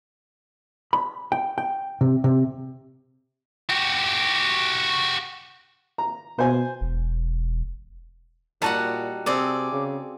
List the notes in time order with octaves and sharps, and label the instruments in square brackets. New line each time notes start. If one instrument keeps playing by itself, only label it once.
[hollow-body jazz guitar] B5
G5
G5
C3
C3
[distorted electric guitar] F#4 G4
[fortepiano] A#5
[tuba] B2 [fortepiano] C5 G#5
[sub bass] E1
[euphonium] A#2 [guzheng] G3 F#4 F#5 [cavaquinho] D#4 A5
[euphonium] C3 [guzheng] C4 G#4 A4 [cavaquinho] D5
[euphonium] C#3